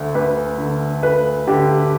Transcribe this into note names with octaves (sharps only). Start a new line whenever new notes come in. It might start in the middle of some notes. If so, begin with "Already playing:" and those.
Already playing: D2 D3
D2 B4
D3
D2 B4
D3 G4